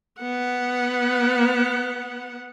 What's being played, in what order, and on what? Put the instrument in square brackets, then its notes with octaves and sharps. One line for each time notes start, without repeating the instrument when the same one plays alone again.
[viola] B3 F#5